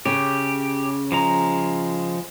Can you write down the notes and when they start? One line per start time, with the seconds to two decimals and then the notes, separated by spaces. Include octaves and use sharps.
0.06 C#3 G4
1.12 F3 G#3 A#5